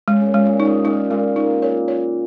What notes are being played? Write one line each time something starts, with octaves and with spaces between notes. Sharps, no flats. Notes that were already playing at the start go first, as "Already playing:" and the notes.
C#3 G#3
C#3
A#2
G#3
A#2
D#4
G#2
A#2 D#4
A#2 G#3
A#3 D#4
A#2 C#5
C#5